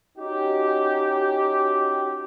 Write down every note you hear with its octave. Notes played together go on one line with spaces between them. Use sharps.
C#4 D#4 F#4 G4